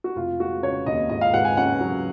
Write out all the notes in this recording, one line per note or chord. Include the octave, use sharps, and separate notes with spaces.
F#4
F1 F4
G#3 F#4
C#3 C#5
D#2 D#5
G#2 D#5
F5
G#2 F#5
G#5
C#4 F#5
F#3